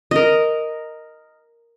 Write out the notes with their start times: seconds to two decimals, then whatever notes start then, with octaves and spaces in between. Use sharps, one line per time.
0.11 A#4 D#5